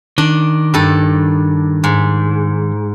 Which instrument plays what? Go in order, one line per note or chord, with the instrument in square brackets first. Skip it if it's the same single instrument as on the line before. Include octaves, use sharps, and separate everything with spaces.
[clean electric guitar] D#3 [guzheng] D4
[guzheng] G2 A4
G#2